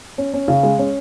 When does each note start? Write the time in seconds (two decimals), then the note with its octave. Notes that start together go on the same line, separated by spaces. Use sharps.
0.18 C#4
0.34 C#4
0.48 C#3
0.63 G#3
0.79 C#4